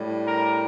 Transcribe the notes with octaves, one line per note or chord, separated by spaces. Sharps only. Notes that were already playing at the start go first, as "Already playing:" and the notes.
Already playing: A2 G3 D4
A#4